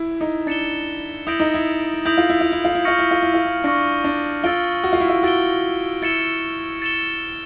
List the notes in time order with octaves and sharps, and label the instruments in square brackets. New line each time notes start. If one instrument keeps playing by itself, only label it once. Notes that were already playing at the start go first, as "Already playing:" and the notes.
Already playing: [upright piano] E4
D#4
[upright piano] D4 [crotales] A6 C#7 E7 G7
[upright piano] E4 [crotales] D#6 G6 A#6 D7 F#7
[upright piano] D#4
E4
[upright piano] E4 [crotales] D#6 G6 A#6 D7 F#7
[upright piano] F4
E4
F4
E4
F4
E4
[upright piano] F4 [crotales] C#6 F6 A#6 C#7
[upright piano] E4
F4
E4
F4
E4
[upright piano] D4 [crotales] C#6 F6 A#6 C#7
[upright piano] D4
[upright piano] F4 [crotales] E6 A6 D7 G7
[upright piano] F#4
F4
E4
F4
[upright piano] F#4 [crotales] E6 A6 D7 G7
[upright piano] E4 [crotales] A6 C#7 E7 G7
[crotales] A6 C#7 E7 G7